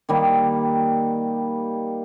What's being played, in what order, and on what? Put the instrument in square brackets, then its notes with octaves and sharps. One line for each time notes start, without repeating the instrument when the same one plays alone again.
[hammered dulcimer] D#3 G3 A#3